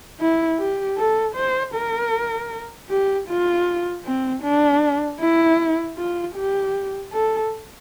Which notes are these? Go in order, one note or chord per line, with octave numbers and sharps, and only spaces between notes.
E4
G4
A4
C5
A#4
G4
F4
C4
D4
E4
F4
G4
A4